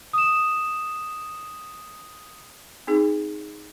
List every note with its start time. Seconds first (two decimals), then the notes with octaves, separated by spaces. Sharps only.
0.13 D#6 E7
2.87 C4 D#4 G#4